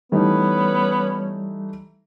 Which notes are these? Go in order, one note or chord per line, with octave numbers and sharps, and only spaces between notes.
E3 G3 A3 B3 C#4 D#4